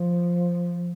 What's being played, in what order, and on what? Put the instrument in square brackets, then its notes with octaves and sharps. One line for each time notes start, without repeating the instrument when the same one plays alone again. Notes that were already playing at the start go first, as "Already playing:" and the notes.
Already playing: [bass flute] F3